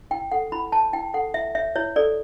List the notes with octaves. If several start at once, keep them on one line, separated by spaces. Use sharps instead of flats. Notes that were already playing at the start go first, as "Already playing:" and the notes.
E4 G5
A4 F#5
E4 B5
C#5 A5
E4 G5
A4 F#5
E4 E5
C#5 E5
E4 C#5
A4 D5